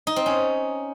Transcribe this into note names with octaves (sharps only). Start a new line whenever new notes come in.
D#4
C4
C#4